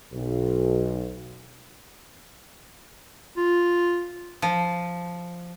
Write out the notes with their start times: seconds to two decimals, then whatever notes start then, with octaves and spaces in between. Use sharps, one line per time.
0.13 B1
3.37 F4
4.42 F3